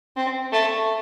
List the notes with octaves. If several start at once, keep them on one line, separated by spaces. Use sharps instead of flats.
C4
A3